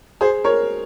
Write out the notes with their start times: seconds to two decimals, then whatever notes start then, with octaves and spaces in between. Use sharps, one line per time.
0.21 G#4 C5
0.44 A#4 C#5